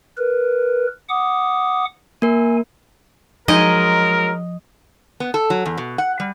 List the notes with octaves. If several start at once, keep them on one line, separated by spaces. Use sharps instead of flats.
A#4 B4
F#5 D6 D#6
A#3 A#4 G#5
F3 F#3 G#3 D#4 A#4 D#5
B3
A4
F#3
E2
B2
F#5
G3